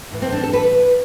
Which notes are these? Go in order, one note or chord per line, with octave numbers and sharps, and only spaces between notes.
A2 E3
C4
D4
A4
B4